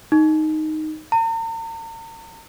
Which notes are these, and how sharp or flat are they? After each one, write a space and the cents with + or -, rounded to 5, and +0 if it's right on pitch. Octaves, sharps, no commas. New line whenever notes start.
D#4 +0
A#5 -45